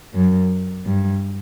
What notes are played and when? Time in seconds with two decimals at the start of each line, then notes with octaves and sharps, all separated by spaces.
0.14 F#2
0.86 G2